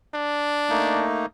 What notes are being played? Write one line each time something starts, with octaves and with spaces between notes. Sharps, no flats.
D4
A3 A#3 D#4